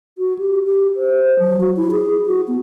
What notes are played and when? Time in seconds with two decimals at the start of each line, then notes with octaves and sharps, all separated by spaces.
0.18 F#4
0.39 G4
0.64 G4
0.96 C5
1.39 F#3
1.60 F#4
1.77 E4
1.91 G#4
2.26 F#4
2.48 B3